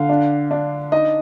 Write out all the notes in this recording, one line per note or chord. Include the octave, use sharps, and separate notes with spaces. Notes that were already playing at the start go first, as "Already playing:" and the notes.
Already playing: D3 F5
D4
D4
D#4 D#5